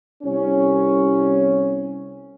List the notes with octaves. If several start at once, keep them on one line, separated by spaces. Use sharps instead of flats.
C2 C#4